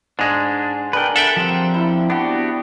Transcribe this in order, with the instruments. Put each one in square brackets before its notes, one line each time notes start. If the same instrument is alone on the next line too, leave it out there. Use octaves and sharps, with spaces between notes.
[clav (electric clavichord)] G#2 G#3 [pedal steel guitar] D4
[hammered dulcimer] D4 G#4 A#4 [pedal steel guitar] B4 G5
[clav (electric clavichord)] A4 E5 G5 [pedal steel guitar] F#5
[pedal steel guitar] F3 C4 [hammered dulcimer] G4
[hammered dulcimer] E4 B5
[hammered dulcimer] B3 [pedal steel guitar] D4 F#4 G4